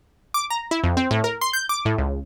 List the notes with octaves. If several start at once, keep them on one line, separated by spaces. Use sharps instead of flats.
D6
A#5
E4
F2
C4
A2
A#4
C6
G6
D6
A2
C#2